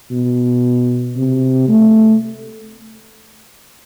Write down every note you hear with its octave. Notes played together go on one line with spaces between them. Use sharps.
B2
C3
A3